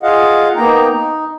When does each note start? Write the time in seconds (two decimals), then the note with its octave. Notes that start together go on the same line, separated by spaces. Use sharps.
0.03 F4 G#4 D#5 F5 F#5
0.56 A#3 B3 D#4 G5 A#5
0.89 D#4